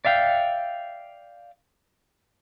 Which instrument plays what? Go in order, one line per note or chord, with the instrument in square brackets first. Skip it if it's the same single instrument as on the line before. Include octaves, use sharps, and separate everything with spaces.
[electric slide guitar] D5 E5 F5 G5